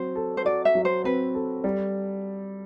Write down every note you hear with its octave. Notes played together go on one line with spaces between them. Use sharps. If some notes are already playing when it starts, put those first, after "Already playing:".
Already playing: F#3 C4 C5
A4
C5
F#4 D5
E5
F#3
C5
C4 B4
A4
G3